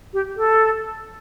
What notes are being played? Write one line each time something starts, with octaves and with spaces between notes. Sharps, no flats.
G4
A4